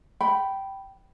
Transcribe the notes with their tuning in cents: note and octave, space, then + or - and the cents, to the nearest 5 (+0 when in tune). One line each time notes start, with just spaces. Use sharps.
G5 -10 B5 +0